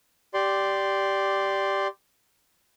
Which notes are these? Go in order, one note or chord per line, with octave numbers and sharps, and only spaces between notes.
G4 D5 C6